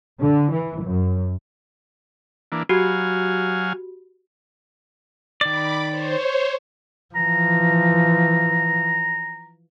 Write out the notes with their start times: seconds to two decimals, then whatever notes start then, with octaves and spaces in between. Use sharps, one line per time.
0.20 D3
0.52 E3
0.84 F#2
2.52 E3 A#3 D4
2.69 F#3 F#4 G4 F5 G#5
5.41 D#3 D5 B5 D6
5.89 C5 C#5
7.15 E3 F3 A#5